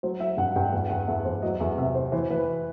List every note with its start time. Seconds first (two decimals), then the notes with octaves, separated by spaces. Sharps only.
0.03 F#3 C5
0.20 F#3 E5
0.37 G2 F#5
0.56 G2 G5
0.72 E2 F#5
0.90 E2 F#5
1.08 E2 E5
1.25 E2 C5
1.42 F#3 D#5
1.60 E2 E5
1.77 C3 E5
1.94 C3 C5
2.12 E3 C5
2.30 E3 B4